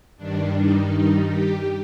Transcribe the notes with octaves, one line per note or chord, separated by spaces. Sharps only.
G2 D#3 G3 D4
D#4
D#4
G4